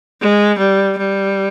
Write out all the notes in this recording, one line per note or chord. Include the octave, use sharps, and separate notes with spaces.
G#3
G3
G3